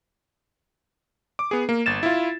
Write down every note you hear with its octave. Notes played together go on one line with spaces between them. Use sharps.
D6
B3 G#4
A#3
G1 A6 E7
E4 F4